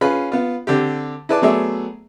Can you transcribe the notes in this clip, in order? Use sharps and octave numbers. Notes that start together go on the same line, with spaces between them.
C#4 F4 G#4 B4 B5
B3 F4
D3 C4 G4
E4 G#4 B4 D5 A5
F#3 A3 B3 G#4 D5 E5